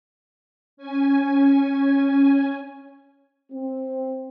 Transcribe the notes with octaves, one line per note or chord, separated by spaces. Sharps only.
C#4 G#5
C4